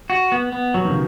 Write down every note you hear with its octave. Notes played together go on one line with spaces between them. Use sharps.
F#4
B3
B3
B2 F#3
D#3
C#3